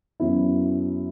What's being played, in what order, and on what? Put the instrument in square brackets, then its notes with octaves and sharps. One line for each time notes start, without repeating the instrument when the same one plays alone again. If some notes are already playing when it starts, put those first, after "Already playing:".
[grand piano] F#2 F#3 B3 E4